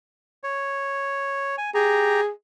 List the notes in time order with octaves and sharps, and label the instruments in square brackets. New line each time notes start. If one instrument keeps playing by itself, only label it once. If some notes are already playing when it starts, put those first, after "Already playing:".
[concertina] C#5
G#5
[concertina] G4 A#5 [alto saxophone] G#4